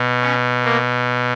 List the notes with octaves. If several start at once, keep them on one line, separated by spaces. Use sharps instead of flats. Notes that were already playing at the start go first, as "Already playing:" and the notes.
Already playing: B2
C#4
A#3